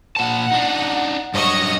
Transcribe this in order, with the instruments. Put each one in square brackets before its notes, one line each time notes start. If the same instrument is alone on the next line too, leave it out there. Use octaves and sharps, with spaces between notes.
[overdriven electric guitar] A#2 A5 [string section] F#5
[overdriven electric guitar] D4 D#4
[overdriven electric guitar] G2 F#3 [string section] D#5 C#6